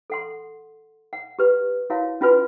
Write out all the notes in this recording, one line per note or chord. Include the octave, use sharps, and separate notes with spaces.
A4 F#5 C6
F#5
G4 B4
E4 F#4 A#4 C#5 F5
C#4 F4 F#4 B4 G#5